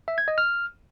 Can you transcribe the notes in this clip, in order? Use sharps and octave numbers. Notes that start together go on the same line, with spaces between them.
E5
G#6
D#5
F6